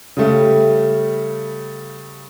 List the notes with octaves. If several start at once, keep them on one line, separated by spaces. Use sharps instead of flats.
C#3 G3 A3